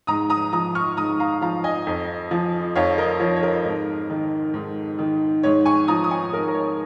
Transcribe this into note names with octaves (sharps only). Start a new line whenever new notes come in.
G#2 A#5 D#6
A#5 D#6
F3 A#5 D#6
C#6 F6
G#2 A#5 D#6
F5 A#5
F3 F5 A#5
D#5 G#5
F2
F3
F2 C#5 F5
A#4 D#5
F3 C#5
C#5
A#4
G#2
D#3
G#2
D#3
G#2 C#5
G#5 C#6
F3 A#5 D#6
D#6
G#5 C#6
G#2 A#4
A#4
C#5